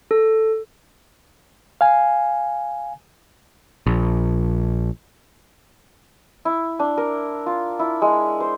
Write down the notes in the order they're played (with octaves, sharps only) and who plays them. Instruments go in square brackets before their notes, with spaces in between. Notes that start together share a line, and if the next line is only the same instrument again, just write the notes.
[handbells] A4
[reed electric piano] F5 G#5
[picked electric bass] A#1
[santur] E4
D4
A#4
F4
E4
G#3
C5